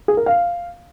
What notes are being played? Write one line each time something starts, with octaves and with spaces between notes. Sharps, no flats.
G#4
A#4
F5